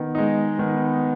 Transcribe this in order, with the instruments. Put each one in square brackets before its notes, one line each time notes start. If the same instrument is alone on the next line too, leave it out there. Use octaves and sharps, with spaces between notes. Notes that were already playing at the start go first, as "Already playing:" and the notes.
Already playing: [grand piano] D#3 [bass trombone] B3
[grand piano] G#3 D#4
[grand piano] D#3 [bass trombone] B3